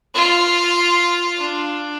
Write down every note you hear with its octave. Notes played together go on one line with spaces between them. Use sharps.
F4
D4